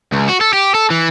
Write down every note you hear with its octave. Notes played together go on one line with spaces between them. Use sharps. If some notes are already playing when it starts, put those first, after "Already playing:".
C#2
F#4
A4
G4
A4
E3